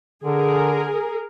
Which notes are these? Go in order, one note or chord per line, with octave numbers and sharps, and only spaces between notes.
D3 G#4 A#4